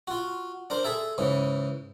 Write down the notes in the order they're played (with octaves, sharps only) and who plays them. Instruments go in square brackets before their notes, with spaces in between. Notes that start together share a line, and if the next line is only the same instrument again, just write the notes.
[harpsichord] F4 F#4
D4 A#4 C5
G#4 A4 E5
G#2 C#3 E3